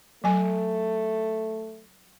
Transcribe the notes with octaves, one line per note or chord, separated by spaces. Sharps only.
F#3 A3 G#5